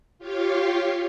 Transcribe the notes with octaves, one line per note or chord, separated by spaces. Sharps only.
F4 G4 C#5 F5